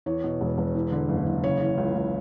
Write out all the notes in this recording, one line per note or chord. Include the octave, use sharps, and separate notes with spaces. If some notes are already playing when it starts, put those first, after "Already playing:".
E2 C#5
B2
E1
E1
E2
D3
F#1
F#1
C#3 C#5
E3
C#2
C#2